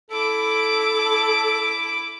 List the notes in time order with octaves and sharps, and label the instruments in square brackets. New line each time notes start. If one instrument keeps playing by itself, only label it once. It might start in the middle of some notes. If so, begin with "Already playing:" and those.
[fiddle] E4 D6 [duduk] A4